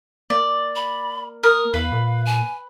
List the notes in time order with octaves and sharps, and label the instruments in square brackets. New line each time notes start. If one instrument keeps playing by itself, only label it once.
[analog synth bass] A#3 [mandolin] D5
[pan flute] B5
[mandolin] A#4 [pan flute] D#6
[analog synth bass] E2 [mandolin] B4 [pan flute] F5
[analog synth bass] A#2
[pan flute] G#5